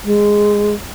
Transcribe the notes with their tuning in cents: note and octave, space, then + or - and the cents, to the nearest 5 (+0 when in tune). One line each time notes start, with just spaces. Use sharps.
G#3 -10